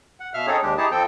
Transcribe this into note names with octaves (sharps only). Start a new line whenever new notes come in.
F#5
B2 E5 F5 F6
C4 C#4 D#4 G#4 A4 C#5
D#2 G#3 D4 G4
D#4 E4 G4 G#4 A5
F2 F3 C4 A4 G5